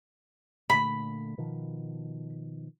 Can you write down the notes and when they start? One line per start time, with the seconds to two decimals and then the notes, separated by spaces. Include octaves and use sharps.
0.70 A#2 D3 A3 B5
1.38 B2 D#3 F3